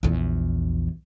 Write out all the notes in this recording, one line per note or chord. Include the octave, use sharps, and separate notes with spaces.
A#1 E2